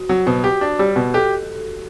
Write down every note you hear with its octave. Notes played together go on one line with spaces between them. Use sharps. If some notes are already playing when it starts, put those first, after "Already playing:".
Already playing: F#4
F#3
B2 F#4
G4
D4
G3 G4
B2
G4 A4